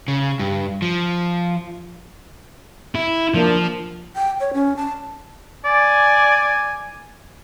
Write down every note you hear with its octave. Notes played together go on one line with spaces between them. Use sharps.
C#3
G2
F3
E4
F3 A#3 D4
G5
C#5
C#4
A5
D5 G#5